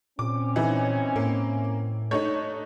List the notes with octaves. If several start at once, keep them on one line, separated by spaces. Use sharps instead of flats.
A#2 C4 C#4 D6
E3 D#4 E4
A2 A#3
A3 D4 D#4 C#5